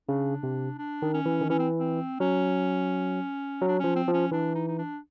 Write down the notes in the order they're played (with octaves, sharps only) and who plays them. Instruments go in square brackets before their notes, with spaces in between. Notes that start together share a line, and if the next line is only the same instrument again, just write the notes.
[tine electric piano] C#3 [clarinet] D4
[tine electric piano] C3
[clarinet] D4
[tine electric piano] D#3
[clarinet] C#4
[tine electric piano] E3
D#3
[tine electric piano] E3 [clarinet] C#4
[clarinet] C4
C4
[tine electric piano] F#3 [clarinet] C#4
[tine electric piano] F#3
[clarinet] D4
[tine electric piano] F3 [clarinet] C#4
[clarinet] C4
[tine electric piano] F3
[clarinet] C#4
[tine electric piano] E3 [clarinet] D4
[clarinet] D#4
D#4
D4